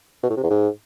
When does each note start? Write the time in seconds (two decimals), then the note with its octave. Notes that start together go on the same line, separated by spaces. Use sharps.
0.23 B2
0.30 A2
0.37 C3
0.44 E2
0.50 G#2